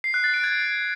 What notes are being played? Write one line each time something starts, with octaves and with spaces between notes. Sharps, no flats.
C7
F#6
A6
D7
G#6